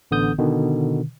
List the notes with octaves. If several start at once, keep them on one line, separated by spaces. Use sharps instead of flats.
A1 D3 B3 D#6 G6
B2 D3 D#3